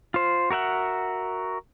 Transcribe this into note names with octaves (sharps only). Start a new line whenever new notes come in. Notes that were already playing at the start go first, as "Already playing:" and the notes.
F4 C5
F#4 A#4 E5 F#5